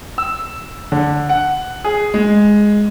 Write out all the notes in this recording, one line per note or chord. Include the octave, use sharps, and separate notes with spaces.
E6
D3
F#5
G#4
G#3